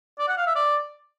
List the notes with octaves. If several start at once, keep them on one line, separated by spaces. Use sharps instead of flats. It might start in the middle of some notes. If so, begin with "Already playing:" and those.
D5
F#5
F5
E5
D5